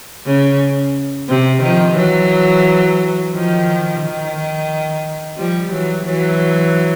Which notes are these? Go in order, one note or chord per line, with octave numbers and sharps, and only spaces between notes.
C#3
C3
D#3 F3
E3 F#3
D#3 F3
D#3
F3 G3
E3 F#3
E3 F#3